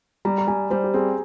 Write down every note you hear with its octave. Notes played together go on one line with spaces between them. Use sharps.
G3 A#5
A#5
G3 G#5
G3 C5
G4
C4 G#4